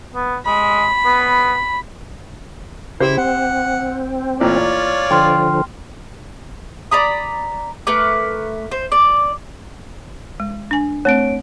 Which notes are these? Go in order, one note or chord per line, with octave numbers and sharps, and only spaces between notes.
B3
G#3 B5
B3
C#3 E4 G4 C5
C4 F#5
A1 A#2 F4 C#5 D5
D3 F3 G5 C6 F6
D5 A#5 B5 D#6
A3 A#4 B4 D6
C5
D5
G#3
D4 G#5
A3 C4 C#5 D7